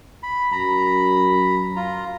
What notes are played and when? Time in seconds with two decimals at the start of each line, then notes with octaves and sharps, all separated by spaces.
0.23 B5
0.52 F#2 A#5 B5
1.76 F4 A#5